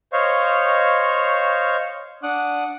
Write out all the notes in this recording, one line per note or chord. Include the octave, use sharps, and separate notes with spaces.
C5 C#5 D#5 F5 C#6
D4 F#5 D6 D#6 F#6